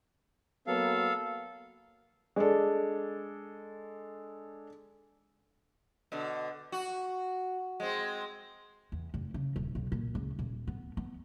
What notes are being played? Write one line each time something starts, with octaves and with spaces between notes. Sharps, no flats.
F#3 A#3 B3 A4 F5
G#3 D4 A4
B2 D3
F#4
G#3 C4
E2
F1
C#3
D#1
B1
A#2
C#2
D#1
B3
B3